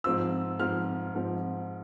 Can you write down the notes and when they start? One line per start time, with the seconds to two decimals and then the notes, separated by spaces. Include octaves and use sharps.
0.04 G#2 F3 C4 F4 E6
0.59 G#2 F3 C4 F4 F6
1.15 G#2 F3 C4 F4